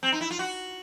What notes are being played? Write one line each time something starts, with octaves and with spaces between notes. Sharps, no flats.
C4
D#4
E4
F4
F#4